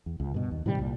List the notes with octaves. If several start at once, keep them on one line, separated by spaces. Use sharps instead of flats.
E2
C#2
G2 B2
D#2
A2 C3 D#3 G3
C2 A#2